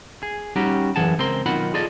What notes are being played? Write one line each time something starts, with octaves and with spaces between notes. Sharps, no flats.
G#4
G3 C#4 D#4 F#4 G4
F#2 E3 G#4 F#5 A5
C#2 C4 A#4 C6
B1 D#3 F4 F#4 F#5 B5
F4 G#4 A4 D5 D#5